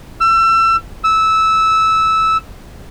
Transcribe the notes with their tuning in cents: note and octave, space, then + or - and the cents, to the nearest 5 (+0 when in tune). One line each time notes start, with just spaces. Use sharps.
E6 +30
E6 -15